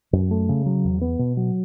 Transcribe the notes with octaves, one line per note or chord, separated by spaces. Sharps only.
F#2
A3
C#3
F#3
E2
B3
B2
F#3